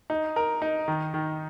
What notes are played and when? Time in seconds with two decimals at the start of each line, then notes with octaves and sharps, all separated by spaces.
0.10 D#4
0.36 A#4
0.62 D#4
0.88 D#3
1.14 D#3